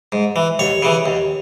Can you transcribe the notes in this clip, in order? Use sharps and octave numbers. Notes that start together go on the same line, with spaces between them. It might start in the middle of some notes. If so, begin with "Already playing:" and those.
G#2
E3
D#2 C#5
C#3 E3
D#2